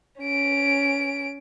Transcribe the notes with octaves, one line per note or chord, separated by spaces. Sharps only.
C#4 D7